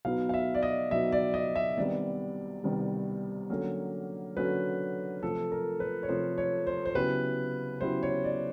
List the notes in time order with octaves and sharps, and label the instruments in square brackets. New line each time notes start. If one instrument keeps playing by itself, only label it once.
[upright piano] B2 F#3 B3 D#4 [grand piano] F5
[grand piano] F5
E5
D5
D#5
[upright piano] B2 F#3 B3 D#4 [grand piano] E5
[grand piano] D5
D#5
E5
[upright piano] C2 C3 D#3 G3 B3 [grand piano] D5
[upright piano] C2 C3 D#3 G3 B3
D3 F#3 A#3 C#4
[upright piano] D3 F#3 A#3 C#4 [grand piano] B4
[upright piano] C3 F3 A3 [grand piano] A4
[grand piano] A#4
B4
C#5
[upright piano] C3 F3 A3 [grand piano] C5
[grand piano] C#5
C5
C5
[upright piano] C#3 F#3 B3 E4 G4 [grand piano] B4
[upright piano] C#3 F#3 B3 E4 G4 [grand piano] C5
[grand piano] C#5
D5